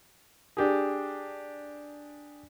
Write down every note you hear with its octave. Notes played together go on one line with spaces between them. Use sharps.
D4 G4 G#4